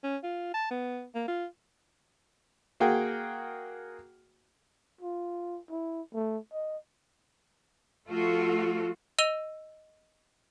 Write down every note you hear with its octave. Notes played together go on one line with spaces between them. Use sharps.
C#4
F4
A5
B3
A#3
F4
A#3 F#4 G#4 G5
F4
E4
A3
D#5
F3 A3 F4 F#4 A4
D#5 E6 D#7 F7 G7